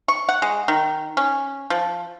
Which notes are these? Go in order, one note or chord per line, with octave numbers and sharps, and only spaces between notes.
C#6
F#5
G#3
D#3
C#4
F3